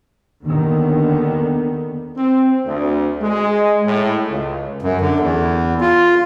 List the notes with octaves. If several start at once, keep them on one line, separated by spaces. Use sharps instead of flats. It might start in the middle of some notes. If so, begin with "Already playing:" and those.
D#2 D3 D#3 B3
C4
D2
G#3
A2
C#2
F#2
D3
E2
F4